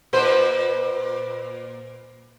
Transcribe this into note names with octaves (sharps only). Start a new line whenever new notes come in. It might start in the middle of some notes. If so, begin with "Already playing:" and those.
A#2 B4 C5